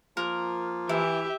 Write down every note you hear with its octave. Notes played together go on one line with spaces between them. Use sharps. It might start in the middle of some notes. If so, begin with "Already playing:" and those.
F3 A#3 F4 A#4
E3 E4 G4 E5